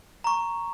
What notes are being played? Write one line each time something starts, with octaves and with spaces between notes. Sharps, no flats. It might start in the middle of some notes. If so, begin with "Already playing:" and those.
A#5 C#6